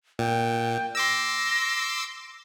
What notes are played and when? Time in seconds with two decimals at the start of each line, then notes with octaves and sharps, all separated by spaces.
0.19 A#2 G5
0.95 C6 D6 E6 A#6